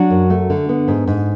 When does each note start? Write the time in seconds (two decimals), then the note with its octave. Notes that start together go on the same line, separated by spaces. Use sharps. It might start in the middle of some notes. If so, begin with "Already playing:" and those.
Already playing: F#3 D4 F#4
0.10 F#2
0.30 A3
0.50 D3
0.69 B3
0.88 G#2
1.07 G#2